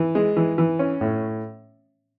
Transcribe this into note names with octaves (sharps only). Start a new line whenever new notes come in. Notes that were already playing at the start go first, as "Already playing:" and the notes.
Already playing: E3
G#3
E3
E3
C#4
A2